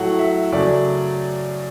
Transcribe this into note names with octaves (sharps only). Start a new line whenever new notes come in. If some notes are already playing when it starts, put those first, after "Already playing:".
Already playing: A2 F#3 A3 F#5
E5
F#2 C#3 F#3 A3 D5